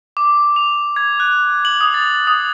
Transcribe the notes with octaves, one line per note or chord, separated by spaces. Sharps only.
D6
F7
G#6
F#6
F#7
D#6
A6
D#6